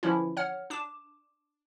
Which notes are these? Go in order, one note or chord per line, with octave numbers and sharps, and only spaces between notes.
D3 E3 F3 C#4 E4
C#5 F#5 F6
D4 D6 E7